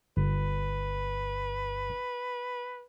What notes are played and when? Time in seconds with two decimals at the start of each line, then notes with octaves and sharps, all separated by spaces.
0.17 G1 B4